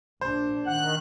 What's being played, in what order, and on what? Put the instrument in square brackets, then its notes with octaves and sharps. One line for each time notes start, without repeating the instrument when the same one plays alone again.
[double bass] A#1 D4 [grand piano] C5
[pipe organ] D#3 F#6 [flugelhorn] F#5